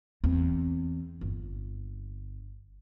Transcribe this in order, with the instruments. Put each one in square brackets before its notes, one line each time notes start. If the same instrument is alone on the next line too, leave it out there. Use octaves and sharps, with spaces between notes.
[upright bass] E2 C4
G1